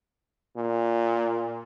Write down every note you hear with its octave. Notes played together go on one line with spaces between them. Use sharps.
A#2